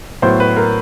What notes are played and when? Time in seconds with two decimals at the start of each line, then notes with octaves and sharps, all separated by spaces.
0.22 A2 F#3 B3 C5
0.40 B4
0.56 A#4